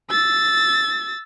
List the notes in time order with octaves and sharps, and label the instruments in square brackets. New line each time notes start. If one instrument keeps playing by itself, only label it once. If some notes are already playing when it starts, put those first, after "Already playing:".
[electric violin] E6 A6